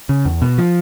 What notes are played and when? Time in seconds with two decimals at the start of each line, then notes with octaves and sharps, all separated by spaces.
0.09 C#3
0.25 E2
0.42 B2
0.58 F3